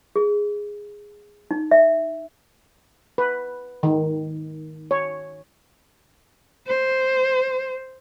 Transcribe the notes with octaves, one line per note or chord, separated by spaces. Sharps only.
G#4
D#4
E5
B4
D#3
C#5
C5